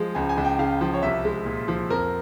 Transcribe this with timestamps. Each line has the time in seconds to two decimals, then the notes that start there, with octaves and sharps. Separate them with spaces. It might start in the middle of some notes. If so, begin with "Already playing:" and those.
Already playing: F3 G#3
0.15 C#2 G#5
0.29 G#5
0.37 C#2
0.45 G5
0.59 C#3 F5
0.81 F3
0.94 C#5
1.02 C2 E5
1.25 G#3
1.46 A#2
1.68 F3
1.90 F2 A#4